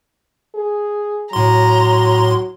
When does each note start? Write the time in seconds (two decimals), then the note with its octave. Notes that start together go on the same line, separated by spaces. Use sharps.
0.55 G#4
1.33 A2 F#3 A#5 C6